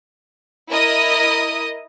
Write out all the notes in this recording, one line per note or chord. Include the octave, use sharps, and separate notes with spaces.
E4 A#4 D#5 D#6